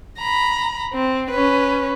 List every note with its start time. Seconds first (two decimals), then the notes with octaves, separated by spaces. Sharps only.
0.18 A#5 B5
0.93 C4
1.31 C#4 B4